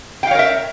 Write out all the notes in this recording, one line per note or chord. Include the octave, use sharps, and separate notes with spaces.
A#4 C#5 E5 F5 G5